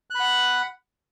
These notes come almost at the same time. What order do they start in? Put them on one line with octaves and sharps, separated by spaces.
F#6 B5 F#5